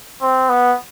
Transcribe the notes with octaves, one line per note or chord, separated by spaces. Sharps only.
C4
B3